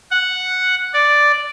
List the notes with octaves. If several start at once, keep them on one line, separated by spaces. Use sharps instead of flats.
F#5
D5